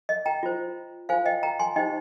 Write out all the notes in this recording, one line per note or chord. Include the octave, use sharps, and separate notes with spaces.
D#5
G5 A#5
F4 C5
F4 C5 F5 G#5
D#5 G5
G5 A#5
G#5 C6
D#4 G4 C5 D#5 G5